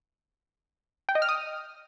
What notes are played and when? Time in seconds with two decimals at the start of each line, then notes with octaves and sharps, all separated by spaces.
1.09 G5
1.15 D#5
1.22 F6
1.29 D#6